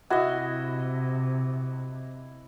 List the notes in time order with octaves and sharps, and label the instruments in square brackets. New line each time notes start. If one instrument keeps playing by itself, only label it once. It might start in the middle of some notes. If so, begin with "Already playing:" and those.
[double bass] C3 [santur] E4 D#5 [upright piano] F#4